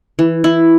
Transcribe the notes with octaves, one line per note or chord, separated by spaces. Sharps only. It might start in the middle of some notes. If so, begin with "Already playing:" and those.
E3
E4